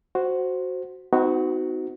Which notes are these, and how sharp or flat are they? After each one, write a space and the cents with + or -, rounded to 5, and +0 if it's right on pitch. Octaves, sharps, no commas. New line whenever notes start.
F#4 +0 C5 +0
C4 -40 D#4 +25 F#4 +0